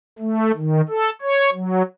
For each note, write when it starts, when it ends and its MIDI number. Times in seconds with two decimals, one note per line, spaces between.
0.19 0.51 57
0.55 0.81 51
0.89 1.10 69
1.22 1.50 73
1.53 1.82 54